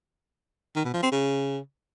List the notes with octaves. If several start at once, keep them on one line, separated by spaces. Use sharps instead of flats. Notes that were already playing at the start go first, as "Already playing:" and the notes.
D#3
B2
F3
C4
C#3